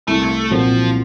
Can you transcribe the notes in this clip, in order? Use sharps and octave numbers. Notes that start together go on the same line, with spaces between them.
C2 A3
A#2 F3 F#3 C4 F#4